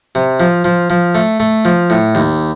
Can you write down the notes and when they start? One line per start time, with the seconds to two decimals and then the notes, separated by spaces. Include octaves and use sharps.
0.15 C3
0.40 F3
0.65 F3
0.90 F3
1.15 A3
1.40 A3
1.65 F3
1.90 A2
2.15 D#2